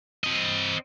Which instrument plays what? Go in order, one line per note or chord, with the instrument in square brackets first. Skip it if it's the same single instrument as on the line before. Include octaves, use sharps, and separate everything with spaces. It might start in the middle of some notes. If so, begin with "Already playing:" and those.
[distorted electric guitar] C4 D#5